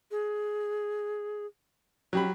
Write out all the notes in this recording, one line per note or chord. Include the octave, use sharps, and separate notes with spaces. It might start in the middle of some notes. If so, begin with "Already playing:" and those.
G#4
F#3 C#4 G4 B5